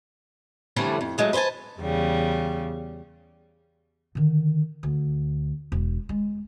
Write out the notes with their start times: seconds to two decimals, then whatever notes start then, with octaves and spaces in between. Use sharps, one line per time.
0.76 F2 D3 E3 G3 A3 C#4
1.01 F2
1.18 E3 F#3 G#3 A3
1.33 B4 C5 D#5 G#5 A5
1.79 E2 C#3 G3
4.15 D3 D#3
4.83 D2
5.72 E1
6.09 G#3